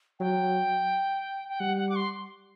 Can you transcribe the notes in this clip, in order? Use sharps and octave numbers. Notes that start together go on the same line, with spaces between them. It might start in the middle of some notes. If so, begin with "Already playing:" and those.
F#3 G5
G5
G3 F#5
F#5
D6
C6